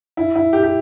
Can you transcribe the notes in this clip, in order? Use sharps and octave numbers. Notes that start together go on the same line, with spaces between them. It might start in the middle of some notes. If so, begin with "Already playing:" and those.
E4
E4
G4
G4